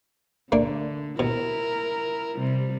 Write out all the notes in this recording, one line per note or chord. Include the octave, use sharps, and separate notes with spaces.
D3 A3 A#3 D4
B2 E4 A#4
C3 G3